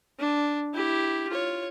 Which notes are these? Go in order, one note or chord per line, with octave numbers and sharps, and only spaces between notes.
D4
E4 G4
F4 C#5